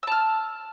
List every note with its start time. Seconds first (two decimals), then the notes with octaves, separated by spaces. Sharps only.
0.03 E6
0.07 A5
0.12 F6